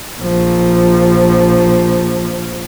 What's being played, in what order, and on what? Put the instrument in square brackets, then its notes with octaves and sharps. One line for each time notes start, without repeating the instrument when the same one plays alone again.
[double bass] A#1 F3